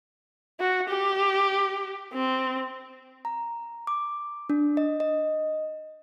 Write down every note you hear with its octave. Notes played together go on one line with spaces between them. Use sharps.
F#4
G4
C4
A#5
D6
D4
D#5
D#5